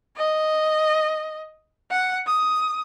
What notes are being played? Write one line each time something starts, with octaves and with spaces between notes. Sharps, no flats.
D#5
F#5
D#6